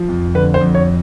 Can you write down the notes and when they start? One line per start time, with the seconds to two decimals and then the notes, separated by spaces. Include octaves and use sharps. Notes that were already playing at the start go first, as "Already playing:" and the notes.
Already playing: F3
0.09 F2
0.35 D3 B4
0.54 C5
0.61 F2
0.75 C#5